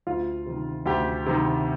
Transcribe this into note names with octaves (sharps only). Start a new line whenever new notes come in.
D2 F4
C3 D#3
D2 G4
C3 D#3